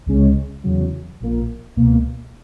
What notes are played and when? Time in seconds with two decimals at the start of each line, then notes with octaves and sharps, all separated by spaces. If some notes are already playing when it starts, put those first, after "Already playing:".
0.06 C#2 C#3 G#3 C#4
0.64 E2 C#3 F#3
1.20 A#1 A#2 A#3
1.76 C#2 B2 A#3